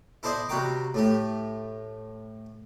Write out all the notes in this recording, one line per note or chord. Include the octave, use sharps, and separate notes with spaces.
E4 A4 C5 D5 D#5
C3 G3 F#4 G5 A#5 D6
A2 A3 G4